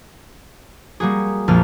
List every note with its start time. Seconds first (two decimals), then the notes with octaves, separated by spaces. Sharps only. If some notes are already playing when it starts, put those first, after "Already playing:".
1.00 G3 A#3 F#4 G#4
1.48 A#1 F2 A5 F6 D#7